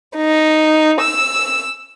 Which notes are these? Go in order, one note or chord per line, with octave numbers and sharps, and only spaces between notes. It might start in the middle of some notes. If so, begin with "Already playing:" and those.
D#4
E6